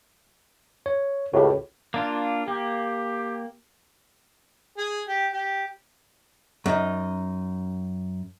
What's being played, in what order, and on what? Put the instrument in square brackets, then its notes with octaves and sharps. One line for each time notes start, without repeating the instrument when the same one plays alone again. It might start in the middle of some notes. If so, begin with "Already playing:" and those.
[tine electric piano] C#5
[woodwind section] C#2 A2 C#3 [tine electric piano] F#4 G4
[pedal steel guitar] A#3 D4 F4
[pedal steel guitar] A#3 [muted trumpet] G4
[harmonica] G#4
G4
G4
[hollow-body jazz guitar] F#2 D#4